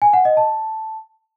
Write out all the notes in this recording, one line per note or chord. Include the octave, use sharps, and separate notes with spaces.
G#5
F#5
D#5
A5